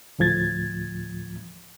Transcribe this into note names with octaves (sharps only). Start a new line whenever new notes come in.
D2 A2 F3 G#6 A6